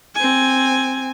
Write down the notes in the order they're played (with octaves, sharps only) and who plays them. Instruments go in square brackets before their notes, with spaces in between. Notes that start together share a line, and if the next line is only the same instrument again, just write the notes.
[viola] C4 G#5